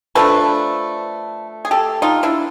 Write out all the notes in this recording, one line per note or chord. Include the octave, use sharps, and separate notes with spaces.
F3 A3 D4 A4 B4
G#4
G4 A4
D#4 F4
D4 E4